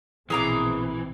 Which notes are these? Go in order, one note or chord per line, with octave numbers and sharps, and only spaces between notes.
A#1 B2 E3 C4 G#4 A#5 D6